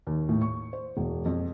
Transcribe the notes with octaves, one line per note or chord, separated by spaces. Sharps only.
D#2
A2
C#6
C5
E1
F2